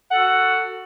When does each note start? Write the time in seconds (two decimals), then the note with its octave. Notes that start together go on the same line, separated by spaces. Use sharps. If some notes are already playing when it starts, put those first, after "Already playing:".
0.10 F#5
0.13 A4
0.17 F#4